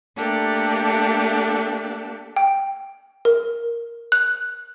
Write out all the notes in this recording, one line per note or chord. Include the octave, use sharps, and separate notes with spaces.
A3 A#3 D4 G4 A4
G5
A#4
F#6